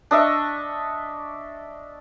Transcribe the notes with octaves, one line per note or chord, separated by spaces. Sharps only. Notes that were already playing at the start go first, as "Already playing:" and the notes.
D4 D#5 E5 C#6